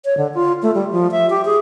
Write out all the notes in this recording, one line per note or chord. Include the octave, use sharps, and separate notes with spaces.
C#5
D3
F4
A3
G3
F3
E5
G4
G#4